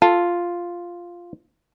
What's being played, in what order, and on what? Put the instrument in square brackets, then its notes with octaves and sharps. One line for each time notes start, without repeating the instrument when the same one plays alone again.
[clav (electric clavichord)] F4 [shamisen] A4